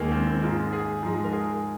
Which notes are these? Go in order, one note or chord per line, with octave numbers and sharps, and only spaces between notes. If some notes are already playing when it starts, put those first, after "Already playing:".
Already playing: D#2 D#3 G#3 A#3
C4
C4
G#2 G#3 F4
G#4
G#2 F3 G#3
A#4
G#4